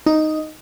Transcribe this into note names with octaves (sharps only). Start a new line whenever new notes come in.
D#4